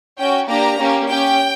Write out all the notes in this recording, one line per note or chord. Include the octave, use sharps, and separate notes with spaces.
C#4 F#4 G5
A#3 D4 G4 A#5
A#3 C#4 G4
C#4 G4 G5